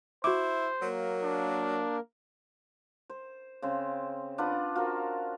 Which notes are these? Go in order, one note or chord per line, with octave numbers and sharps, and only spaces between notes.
E4 F#4 C5 D6
F#3 A#3 A#4
D4
C5
C#3 C4 C6
D4 F4 B4 F#5
F4 F#4 A#4 C5